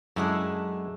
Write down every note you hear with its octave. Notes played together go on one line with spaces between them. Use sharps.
F#2 G#3 A3 D4 E4 G#4